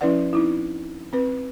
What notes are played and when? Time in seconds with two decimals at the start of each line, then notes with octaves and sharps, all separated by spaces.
0.01 F3 C#4 E4 B4 D5 F#5
0.33 C4 D#4 E4
1.13 C4 B4